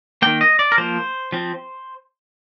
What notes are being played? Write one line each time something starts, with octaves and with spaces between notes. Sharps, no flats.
D#3 A#3 G5
D#5
D5
A#4
F3 A#3 C5
F3 C4